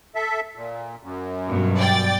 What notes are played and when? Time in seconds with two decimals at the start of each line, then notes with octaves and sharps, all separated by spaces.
0.15 A4 E5
0.56 A#2
1.03 F#2
1.47 G2 B2 F#3
1.77 D5 G5 A6